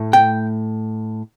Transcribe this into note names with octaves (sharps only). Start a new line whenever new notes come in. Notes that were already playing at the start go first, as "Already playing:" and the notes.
Already playing: A2 A3
G5